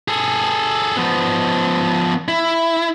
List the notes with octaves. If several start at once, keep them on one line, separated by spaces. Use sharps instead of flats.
G#4 A4
F3 B3
E4